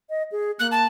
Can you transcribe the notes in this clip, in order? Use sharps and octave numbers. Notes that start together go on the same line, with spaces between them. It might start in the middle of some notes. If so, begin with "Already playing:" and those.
D#5
G#4
A#3 F#6
A5